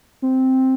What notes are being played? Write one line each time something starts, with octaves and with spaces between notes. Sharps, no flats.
C4